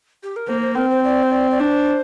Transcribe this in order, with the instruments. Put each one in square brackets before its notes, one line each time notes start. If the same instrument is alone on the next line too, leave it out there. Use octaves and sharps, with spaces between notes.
[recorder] G4
A#4
[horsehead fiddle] A#3 [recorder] C5
[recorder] C5
[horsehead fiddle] C4 [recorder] A#4
[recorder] C5
D5
C5
D5
D5
[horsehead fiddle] D4 [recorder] C5